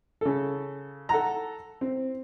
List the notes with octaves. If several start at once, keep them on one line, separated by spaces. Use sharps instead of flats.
C#3 A4
A4 F#5 A#5
C4